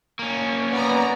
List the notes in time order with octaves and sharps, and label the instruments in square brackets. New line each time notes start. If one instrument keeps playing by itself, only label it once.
[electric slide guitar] A#3 C#4
[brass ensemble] B3 [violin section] D5 A#5